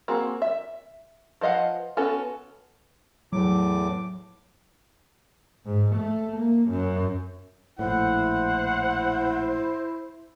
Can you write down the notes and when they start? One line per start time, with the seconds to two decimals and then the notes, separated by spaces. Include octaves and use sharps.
0.08 A#3 C4 F#4 G#4
0.42 E5
1.41 F3 B4 D#5 F5 F#5
1.97 B3 C#4 F#4 A4
3.32 E2 A2 F#3 D6
5.66 G#2
5.96 A3
6.37 A#3
6.69 F#2
7.79 A#1 A2 E4 C5 F#5